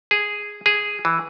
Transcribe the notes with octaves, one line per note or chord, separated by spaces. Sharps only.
G#4
G#4
E3